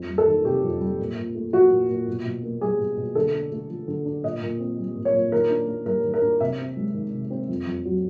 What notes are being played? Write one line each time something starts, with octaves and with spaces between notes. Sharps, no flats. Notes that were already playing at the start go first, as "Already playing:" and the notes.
Already playing: F2
G3
A4
D#3
C3 G4
F2
G3
A#2
A#2
A3
F3 F#4
A#2
A#2
B2
B2
A#3
G3 G#4
B2
B2
D3 A4
D4
A3
F3
D3
D4
A#2 D#5
A#2
C4
G3
A#2
C#5
A#2
D#3 A#4
D4
A#3
G3 A#4
D#3
A#4
D4
C3 E5
C4
G#3
D#3
C3
C4
F2
F2
F#3